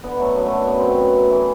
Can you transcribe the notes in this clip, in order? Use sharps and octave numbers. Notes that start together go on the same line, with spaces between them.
D3 B3
F#3 A3
F#2 B3
A3
D3
F#2 B3
F#2 C4
B3
F#2
F#2
E3